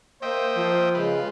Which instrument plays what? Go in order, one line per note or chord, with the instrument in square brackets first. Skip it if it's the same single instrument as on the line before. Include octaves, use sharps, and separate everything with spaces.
[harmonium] A#3 [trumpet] C5 [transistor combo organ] D#5 E5 G5
[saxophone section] F3
[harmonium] C#3 G#3 [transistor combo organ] F4 B4